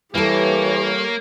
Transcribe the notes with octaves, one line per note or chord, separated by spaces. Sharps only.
E3 G3 A#3 G4 A4 C#5